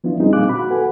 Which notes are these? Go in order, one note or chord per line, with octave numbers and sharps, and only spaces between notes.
F3 B3 D4 E4 F4
G3 C4 D4 D#4 G#4
A#2 A#3 F5 G#5 D6 F#6
F#4 B5
F#4 A4 B4 F#5 G#5